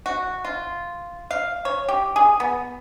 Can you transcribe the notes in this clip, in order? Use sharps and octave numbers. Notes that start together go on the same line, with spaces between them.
F#4
F4
F5
C#5
G4
G#4
B3